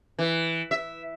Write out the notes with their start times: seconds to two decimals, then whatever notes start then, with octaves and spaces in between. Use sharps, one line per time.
0.19 E3
0.71 E5